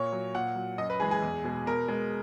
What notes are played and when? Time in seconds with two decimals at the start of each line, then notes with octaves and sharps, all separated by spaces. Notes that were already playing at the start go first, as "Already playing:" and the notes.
Already playing: A#2 C#5
0.13 F#3
0.34 A#2 F#5
0.56 F#3
0.78 F#2 D#5
0.90 B4
1.00 E3 G#3 G#4
1.11 G#4
1.22 E2
1.44 B2 G#3
1.66 B2 A#4
1.88 G#3